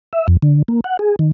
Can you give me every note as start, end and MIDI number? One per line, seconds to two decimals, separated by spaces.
0.13 0.27 76
0.28 0.37 41
0.42 0.62 50
0.68 0.81 58
0.84 0.97 78
0.99 1.16 68
1.19 1.32 51